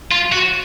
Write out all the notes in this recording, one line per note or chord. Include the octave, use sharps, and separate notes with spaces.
F4
F#4